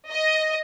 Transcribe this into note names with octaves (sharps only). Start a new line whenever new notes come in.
D#5